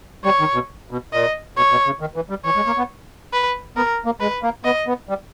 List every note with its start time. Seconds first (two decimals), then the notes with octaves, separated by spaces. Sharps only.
0.25 G3 C#5
0.40 D#3
0.54 B2
0.91 B2
1.13 A#2 D#5
1.57 B2 C#5
1.71 B2
1.86 C#3
2.01 D#3
2.16 E3
2.30 G3
2.45 E3 C#5
2.56 G#3
2.66 A#3
2.78 B3
3.33 B4
3.77 B3 A#4
4.06 A#3
4.20 G#3 B4
4.43 A#3
4.64 B3 D#5
4.87 B3
5.09 G3